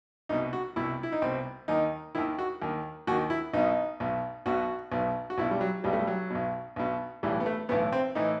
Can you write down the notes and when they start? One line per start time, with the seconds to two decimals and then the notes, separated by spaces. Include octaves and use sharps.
0.29 C2 B2 D#4
0.53 F#4
0.76 C2 B2 E4
1.03 E4
1.12 D#4
1.22 C2 B2 C4
1.68 D#2 D#3 D#4
2.15 D#2 D#3 E4
2.39 F#4
2.62 D#2 D#3
3.07 D#2 D#3 F#4
3.30 E4
3.53 B1 B2 D#4
4.00 B1 B2
4.46 B1 B2 F#4
4.92 B1 B2
5.30 F#4
5.38 B1 B2 E4
5.51 G3
5.61 F#3
5.84 B1 B2 G3
5.93 A3
5.99 G3
6.07 F#3
6.30 B1 B2
6.76 B1 B2
7.23 B1 A2 E3 G3
7.40 B3
7.46 A3
7.69 B1 A2 E3 B3
7.92 C4
8.15 A2 E3 D#4